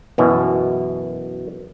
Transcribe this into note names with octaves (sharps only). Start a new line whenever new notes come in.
F#2 B2 E3